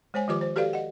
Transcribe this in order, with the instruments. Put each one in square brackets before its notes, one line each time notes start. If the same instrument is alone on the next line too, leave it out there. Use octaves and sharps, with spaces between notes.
[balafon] G#3 C5 C#5 G#5
D#3 F3 F4 G4 B4 D6
C5
F#4 G4 A4 B4 D5 F5
D#5 F#5